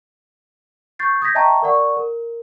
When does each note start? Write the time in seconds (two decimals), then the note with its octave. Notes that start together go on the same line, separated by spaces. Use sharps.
0.99 C#6 G6 A6 C7
1.22 D#6 G6 G#6 A#6 B6
1.35 D#5 E5 G5 A5 A#5 C#6
1.62 A#4 D5 F#5 C#6
1.97 A#4